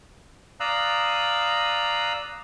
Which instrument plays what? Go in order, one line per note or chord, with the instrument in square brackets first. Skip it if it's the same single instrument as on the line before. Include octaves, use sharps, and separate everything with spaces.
[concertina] D5 F5 A#5 D#6 E6 F#6